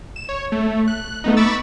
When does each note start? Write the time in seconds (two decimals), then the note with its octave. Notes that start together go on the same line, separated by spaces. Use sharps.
0.16 E7
0.29 C#5
0.52 A3
0.88 F#6
1.24 A3 B3 D#4
1.37 B5 C#6 D6 E6 A6